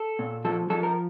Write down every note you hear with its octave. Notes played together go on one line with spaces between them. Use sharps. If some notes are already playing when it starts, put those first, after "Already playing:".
Already playing: A4
A#2
F3 A4
F3 A4
A#4